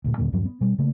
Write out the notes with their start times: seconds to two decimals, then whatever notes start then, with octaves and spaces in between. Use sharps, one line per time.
0.04 D2 A#2
0.18 D#2 A#2 D3 A#3
0.33 D#1 G2 F3 F#3
0.45 B3
0.61 B2 G3
0.78 C#3 A3 A#3